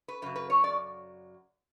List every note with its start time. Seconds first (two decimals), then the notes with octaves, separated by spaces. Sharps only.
0.08 B4
0.22 F#2 C#3 F#3 B4
0.36 B4
0.50 C#5
0.64 D5